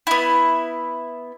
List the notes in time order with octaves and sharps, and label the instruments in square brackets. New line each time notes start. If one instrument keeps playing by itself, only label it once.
[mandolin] B3 E4